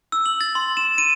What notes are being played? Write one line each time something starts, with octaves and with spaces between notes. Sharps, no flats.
E6
F#7
A6
C6
E7
D#7